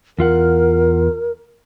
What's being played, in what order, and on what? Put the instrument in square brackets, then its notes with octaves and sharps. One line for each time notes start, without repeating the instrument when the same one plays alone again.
[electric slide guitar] E2 F4 F#5 [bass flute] A#4